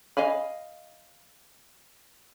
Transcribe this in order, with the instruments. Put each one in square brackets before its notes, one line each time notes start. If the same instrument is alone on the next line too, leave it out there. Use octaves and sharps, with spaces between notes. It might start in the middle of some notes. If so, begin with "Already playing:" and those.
[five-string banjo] D#5 F5 G#5 B5